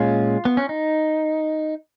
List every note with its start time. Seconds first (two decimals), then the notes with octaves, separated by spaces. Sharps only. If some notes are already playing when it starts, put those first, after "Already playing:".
Already playing: A#2 G#3 C#4 F4
0.45 B3
0.57 C#4
0.69 D#4